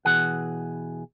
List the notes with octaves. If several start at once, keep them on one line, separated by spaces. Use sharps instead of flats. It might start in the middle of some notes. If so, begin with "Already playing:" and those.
B2 E3 G#4 F#5